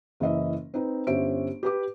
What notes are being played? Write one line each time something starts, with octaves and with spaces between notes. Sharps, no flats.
F#1 E3 D#5 E5
C4 D#4 B4
G1 C#4 G4 C5 E5 D7
G4 B4 D6